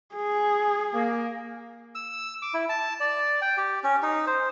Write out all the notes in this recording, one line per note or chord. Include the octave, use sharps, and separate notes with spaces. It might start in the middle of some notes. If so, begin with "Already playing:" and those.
G#4
A#3
E6
D6
E4
A5
D5
G5
G4
C#4
D#4
C5